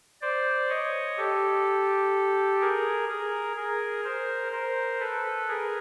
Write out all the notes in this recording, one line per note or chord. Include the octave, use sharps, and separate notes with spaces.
C5 D5
C#5 D#5
G4 A4
G#4 A#4
G#4 A#4
G#4 A#4
A#4 C5
A#4 C5
A4 B4
G#4 A#4